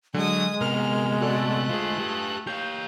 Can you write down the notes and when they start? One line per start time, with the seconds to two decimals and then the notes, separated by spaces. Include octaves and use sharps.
0.14 D3 F#3 G#3 G#5 D#6
0.61 C3 B3 A#4 F6
1.21 A3 F#4 A4 D5 F#6
1.69 D3 F4 G#4 C5
1.99 G4 B4
2.47 G4 C#5 F5 G6